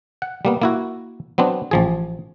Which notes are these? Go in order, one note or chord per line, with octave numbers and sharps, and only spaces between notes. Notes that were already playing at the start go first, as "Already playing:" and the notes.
F#5
G3 A#3 B3
A#3 E4 F#4
F#3 B3 C4 D4
A1 F3 G#4